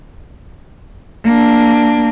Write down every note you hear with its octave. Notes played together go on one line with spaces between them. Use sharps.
A#3 D4